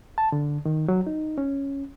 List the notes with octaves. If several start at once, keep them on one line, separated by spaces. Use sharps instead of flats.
A5
D3
D#3
F#3
D#4
C#4